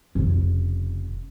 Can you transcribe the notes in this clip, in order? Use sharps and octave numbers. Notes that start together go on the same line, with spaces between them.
F1 C#3